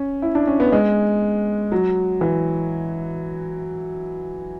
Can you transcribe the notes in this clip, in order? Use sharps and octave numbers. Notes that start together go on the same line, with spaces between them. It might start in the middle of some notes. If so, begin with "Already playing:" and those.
Already playing: C#4
E4
D4
C#4
B3
G#3
F#3
E3